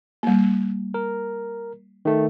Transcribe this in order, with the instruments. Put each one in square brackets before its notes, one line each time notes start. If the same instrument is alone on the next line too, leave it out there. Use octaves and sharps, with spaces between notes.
[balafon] G3 A#3
[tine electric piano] A#4
D#3 A3